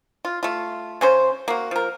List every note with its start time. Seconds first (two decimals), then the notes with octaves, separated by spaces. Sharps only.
0.25 F4
0.43 A3 F4
1.01 C#3 C#4 C5
1.48 A#3 F#4
1.71 F3 A#4